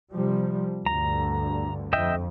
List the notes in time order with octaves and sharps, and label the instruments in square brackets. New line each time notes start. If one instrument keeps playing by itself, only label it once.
[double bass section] C3 F3 G3
[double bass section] D2 G2 D3 [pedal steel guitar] A#5
[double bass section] F2 [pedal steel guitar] D#5 E5 G5